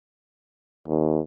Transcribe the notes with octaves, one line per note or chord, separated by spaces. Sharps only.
D#2